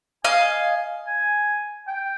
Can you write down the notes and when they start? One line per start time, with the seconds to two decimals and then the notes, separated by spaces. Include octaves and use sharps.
0.24 D#5 F5 G#5
1.07 G#5
1.88 G5